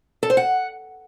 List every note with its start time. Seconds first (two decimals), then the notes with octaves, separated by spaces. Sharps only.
0.23 A4
0.30 C5
0.37 F#5